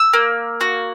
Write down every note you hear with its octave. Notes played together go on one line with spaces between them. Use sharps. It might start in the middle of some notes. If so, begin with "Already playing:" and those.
Already playing: E6
A#3
F#4